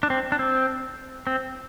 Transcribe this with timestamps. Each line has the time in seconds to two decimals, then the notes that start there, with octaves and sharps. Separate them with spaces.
0.03 D4
0.10 C4
0.32 D4
0.39 C4
1.27 C4